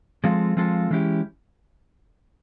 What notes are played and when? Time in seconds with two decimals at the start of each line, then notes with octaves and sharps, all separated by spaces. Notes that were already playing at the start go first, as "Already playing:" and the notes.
0.24 F3 G#3 C4 F4 A4
0.57 F3 G#3 C4 F4 A4
0.91 E3 G#3 C#4 E4 G4